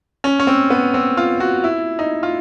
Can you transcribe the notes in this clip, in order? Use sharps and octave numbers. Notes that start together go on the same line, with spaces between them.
C#4
C#4
C4
B3
C4
F4
F#4
E4
D#4
F4